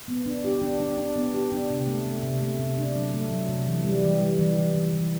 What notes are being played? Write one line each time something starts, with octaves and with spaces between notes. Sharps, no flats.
B3
D4
G4
D4
D4
D4
B3
G4
D4
C3
A3
A3
C3
A3
C3
D4
F#3
A3
F#3
C3
E3
G3
E3
G3
E3
E3
E3
E3